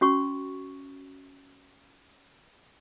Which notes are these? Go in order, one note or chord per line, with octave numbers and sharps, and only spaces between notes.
C#4 F#4 C#6